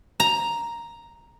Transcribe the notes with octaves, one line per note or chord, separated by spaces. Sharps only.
A#5